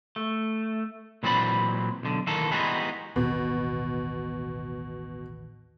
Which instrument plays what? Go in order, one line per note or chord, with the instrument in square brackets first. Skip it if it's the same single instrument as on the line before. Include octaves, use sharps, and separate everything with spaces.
[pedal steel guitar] A3
[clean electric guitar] A#2 E3 F#3 C4 D5 B5
B1 D3
D#3 E3 A#3 A4
E3 G3 G#3 B3 D#4 F#4
[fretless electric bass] A1 D#2 [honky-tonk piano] B2